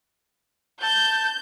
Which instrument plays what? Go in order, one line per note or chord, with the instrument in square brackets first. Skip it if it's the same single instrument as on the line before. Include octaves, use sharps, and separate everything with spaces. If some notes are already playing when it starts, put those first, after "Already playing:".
[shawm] A5 [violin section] G6